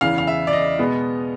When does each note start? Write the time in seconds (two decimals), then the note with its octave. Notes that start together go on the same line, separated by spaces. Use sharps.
0.01 E2 C#3 E3 F5
0.18 F5
0.27 E5
0.47 D5
0.53 D#5
0.79 B2 G#3 B3